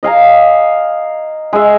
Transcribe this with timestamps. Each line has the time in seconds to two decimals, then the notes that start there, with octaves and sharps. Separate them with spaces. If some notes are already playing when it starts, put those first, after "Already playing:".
0.03 D#5 F5 G#5 A#5
1.53 G#3 E5